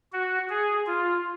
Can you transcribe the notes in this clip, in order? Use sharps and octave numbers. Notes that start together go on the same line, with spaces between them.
F#4
G#4
F4